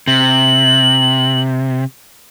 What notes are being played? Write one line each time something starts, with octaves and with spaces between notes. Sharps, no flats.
C3 F#7